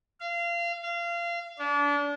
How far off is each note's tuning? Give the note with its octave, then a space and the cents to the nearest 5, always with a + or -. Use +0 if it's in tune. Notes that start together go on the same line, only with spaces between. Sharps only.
F5 -25
F5 -25
D4 -30